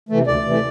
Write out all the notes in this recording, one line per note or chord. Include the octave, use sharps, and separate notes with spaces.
C3 E3 A3
D2 D5
C3 E3 A3